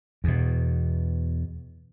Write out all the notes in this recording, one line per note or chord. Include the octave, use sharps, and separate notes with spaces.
E2 B2